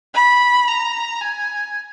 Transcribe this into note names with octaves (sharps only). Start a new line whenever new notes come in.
B5
A#5
G#5